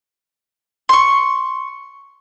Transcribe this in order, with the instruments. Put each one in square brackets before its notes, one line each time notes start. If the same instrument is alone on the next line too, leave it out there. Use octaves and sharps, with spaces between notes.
[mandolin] C6 C#6